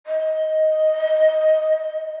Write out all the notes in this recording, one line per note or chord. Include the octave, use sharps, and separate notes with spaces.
D#5